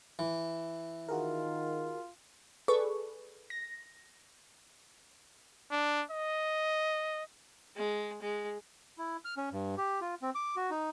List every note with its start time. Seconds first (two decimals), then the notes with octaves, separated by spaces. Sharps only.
0.19 E3
1.09 D#3 F4 F#4 G#4 A#4
2.68 G#4 A4 B4 D5 C#6
3.50 A#6
5.72 D4
6.11 D#5
7.77 G#3
8.22 G#3
8.98 E4
9.25 F6
9.37 C#4
9.52 G2
9.78 G4
10.01 F4
10.22 C4
10.35 D6
10.56 F#4
10.70 D#4